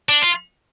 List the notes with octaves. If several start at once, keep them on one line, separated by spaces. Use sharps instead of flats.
D4
F4